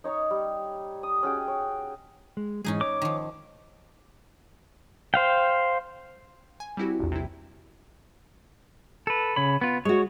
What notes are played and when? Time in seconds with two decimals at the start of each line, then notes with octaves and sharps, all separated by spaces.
0.04 D#4 C#5 A#5 C#6
0.30 G3
1.03 D#6
1.23 C#4 F#4 G#4 G5
1.48 C#5
2.37 G#3
2.64 G#2 E3 G#3 C#4 D#4 G#4
2.81 C#5 D6
3.02 D#3 F3
5.14 C5 F5 G5
6.60 G#5
6.77 G3 C4 E4 F#4 G4
6.99 A#1 E2
7.12 C3 E4
9.07 A4 B4
9.36 C#3 C#5 B5
9.61 B3 F4
9.85 G#3 F#4 C#5